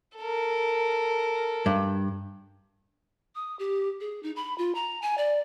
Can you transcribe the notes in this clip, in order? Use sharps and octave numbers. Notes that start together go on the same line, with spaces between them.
A4 A#4
G2
D#6
G4
G#4
D#4
B5
F4
A#5
G#5
D5